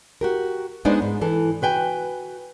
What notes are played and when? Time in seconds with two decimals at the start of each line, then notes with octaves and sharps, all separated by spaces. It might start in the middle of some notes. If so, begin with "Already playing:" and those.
0.21 F#4 G4 A#4
0.85 G#3 B3 D4 D#4 C5 D5
1.02 G#2
1.21 E3 A4
1.62 F#4 B4 G5 G#5